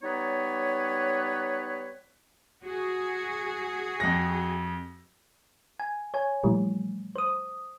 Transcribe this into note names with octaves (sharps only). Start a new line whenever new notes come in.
G3 B3 D#4 B4 C#5
F#4 G#4
F2 A#6
G#5
C#5 G#5
A#2 E3 F3 G3 A3
C5 D#6